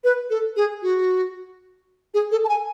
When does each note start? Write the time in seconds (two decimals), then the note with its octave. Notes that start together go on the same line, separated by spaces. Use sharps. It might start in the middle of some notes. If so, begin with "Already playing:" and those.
0.04 B4
0.30 A4
0.56 G#4
0.82 F#4
2.14 G#4
2.32 A4
2.44 A5
2.49 G#5